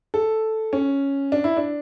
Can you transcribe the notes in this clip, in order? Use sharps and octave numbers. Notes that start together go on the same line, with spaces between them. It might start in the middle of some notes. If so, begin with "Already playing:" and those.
A4
C#4
D4
E4
D4